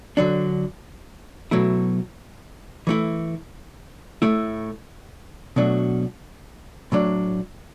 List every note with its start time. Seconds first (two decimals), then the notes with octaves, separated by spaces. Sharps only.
0.17 D3 F#3 D4
1.51 B2 F#3 A3 E4
2.87 E3 A3 E4
4.22 A2 A3 E4
5.56 B2 F#3 A3 D4
6.92 A2 F#3 D4